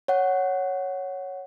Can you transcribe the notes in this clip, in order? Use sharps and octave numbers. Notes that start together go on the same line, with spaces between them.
C#5 F#5